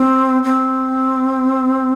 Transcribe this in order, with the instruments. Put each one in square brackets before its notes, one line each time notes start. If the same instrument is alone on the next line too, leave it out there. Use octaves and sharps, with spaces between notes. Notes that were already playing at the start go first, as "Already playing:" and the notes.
Already playing: [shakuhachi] C4
C4